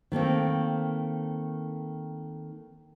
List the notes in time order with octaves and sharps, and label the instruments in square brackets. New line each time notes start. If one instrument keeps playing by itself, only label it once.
[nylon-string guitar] D#3 A3 A#3 C4